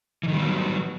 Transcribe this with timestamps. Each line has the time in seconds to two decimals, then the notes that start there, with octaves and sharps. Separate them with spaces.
0.23 E3
0.28 D#3
0.33 G3
0.37 B3
0.42 F#3